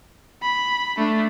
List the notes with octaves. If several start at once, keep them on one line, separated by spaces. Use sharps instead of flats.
B5
A3 D4